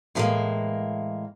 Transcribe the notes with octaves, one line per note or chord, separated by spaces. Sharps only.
A2 E3 F3 G3 G#3 A#3